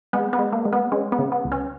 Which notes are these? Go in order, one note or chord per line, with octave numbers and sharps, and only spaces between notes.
G#3 B3
B3
G#3
A#3
G#3
B3
G#3 C#4
B3
C#3
B3
C#2
C#4